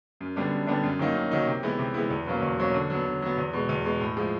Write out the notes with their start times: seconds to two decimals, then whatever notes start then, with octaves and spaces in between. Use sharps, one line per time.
0.21 F#2
0.36 D3 G3 B3 D4
0.51 F#2
0.67 D3 G3 B3 D4
0.83 F#2
0.99 D#3 F#3 A#3 D#4
1.15 F#2
1.31 D#3 F#3 A#3 D#4
1.47 C3
1.63 E3 G#3 B3 E4
1.79 C3
1.94 E3 G#3 B3 E4
2.10 E2
2.26 B2 F#3 A#3 C#4
2.42 E2
2.58 B2 F#3 A#3 C#4
2.74 D3
2.90 F#3 B3
3.05 D3
3.22 F#3 B3
3.38 E2
3.53 B2 G#3
3.69 E2
3.85 B2 G#3
4.00 A2
4.17 F3 G#3